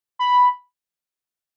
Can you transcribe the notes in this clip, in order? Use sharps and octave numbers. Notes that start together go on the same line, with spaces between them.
B5